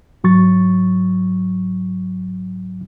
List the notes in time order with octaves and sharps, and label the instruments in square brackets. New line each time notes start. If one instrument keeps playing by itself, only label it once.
[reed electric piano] G#2 F#3 C#6 A6